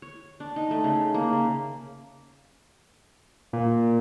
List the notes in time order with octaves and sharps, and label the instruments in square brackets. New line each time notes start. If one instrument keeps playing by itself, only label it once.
[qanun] C#5
D4
D#4
A3
C#3
A#3
C#3
[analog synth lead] A#2